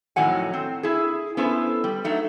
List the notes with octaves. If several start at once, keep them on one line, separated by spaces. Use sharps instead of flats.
F2 A2 D#3 F#3 F#5 G#5
C4
E4 G#4
B3 C#4 E4 A4 C5
G3
F#3 A3 D#4